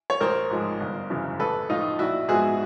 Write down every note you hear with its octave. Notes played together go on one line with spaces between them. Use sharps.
C#5
A1 A#4 C5
G#2 F3 G#3
G1
F#2 C#3 E3
A1 A4 B4
A2 F3 D#4 F4
A#1 E4 F#4
G#2 F3 G#3 B3 F#4 G#4